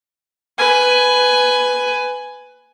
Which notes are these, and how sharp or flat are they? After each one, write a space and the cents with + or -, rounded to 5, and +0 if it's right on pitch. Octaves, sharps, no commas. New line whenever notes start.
B4 +10 G#5 +10